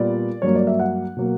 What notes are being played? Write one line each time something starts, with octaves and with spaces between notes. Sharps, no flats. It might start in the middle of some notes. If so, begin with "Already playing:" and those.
Already playing: A#2 G3 B3 D5
G2 F#3 A#3 C#5
D5
E5
F#5
B2 F#3 A#3